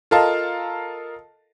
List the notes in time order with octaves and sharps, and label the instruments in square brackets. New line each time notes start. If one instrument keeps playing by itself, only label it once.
[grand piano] F4 A4 A#4 D#5 F5 A5